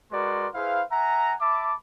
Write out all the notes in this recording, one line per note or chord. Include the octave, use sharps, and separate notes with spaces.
G#3 F#4 A#4 B4 D5 C6
E4 G#4 B4 C5 F5
E5 F#5 G#5 A#5
E5 A5 B5 D6